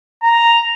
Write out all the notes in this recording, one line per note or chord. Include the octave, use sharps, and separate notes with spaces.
A#5